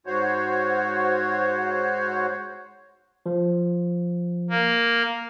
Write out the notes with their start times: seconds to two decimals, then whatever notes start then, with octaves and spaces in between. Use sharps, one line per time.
0.06 G#2 F#4 C5 C#5
3.26 F3
4.50 A#3